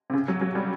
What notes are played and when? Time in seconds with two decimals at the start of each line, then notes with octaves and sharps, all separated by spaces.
0.10 C3
0.13 C#3
0.28 F#3
0.41 F#3
0.55 G3